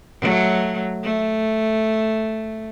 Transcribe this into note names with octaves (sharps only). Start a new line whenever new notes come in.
F#3 A3
A3